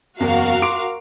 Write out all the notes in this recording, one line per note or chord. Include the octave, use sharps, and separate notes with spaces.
F#1 E2 F#4 A#4 F5
C6 D6 D7